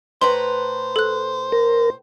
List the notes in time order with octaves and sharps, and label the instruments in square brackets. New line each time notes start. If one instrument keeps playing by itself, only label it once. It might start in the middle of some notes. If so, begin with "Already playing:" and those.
[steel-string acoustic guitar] A2 B4 A#5 [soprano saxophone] C5 [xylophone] C6
[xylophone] A4 F#6
[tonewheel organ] A#4